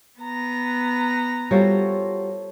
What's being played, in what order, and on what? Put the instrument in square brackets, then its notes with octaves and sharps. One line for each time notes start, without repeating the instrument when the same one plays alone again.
[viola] B3 A#5
[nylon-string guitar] G3 F4 F#4 [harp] A4 C5 C#5